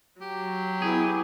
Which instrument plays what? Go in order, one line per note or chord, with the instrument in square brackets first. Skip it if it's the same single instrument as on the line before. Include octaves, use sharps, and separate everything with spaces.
[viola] F#3 [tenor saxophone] G4
[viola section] B3 E4 [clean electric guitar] G#4